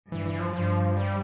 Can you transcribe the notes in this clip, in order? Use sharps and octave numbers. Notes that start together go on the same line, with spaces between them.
G2 E3
E3
F3
G2 F3
G3